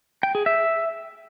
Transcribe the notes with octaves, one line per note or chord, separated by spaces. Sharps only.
G5
G#4
E5